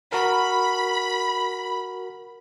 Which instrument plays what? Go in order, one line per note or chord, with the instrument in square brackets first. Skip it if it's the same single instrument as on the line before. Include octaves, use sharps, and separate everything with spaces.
[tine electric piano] F#4 A#4 [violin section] B5